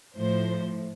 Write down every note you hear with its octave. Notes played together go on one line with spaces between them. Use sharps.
A2 F3 C5